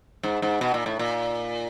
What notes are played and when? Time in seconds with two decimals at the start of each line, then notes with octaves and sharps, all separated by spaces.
0.23 G#2
0.42 G#2
0.61 B2
0.74 A#2
0.86 A2
0.99 A#2